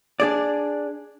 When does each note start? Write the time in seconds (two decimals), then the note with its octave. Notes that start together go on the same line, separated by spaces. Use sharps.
0.20 D4 G#4 D5